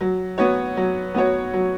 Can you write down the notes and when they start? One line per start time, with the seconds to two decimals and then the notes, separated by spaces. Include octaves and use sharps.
0.01 F#3
0.38 B3 F#4 C#5
0.77 F#3
1.14 B3 F#4 C#5
1.54 F#3